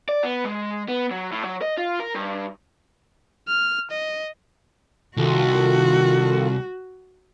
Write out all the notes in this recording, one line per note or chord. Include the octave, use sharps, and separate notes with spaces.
D5
B3
G#3
B3
F#3
A2
F#3
D#5
F4
A#4
G2
F6
D#5
C2 D#3 F4 F#4 A4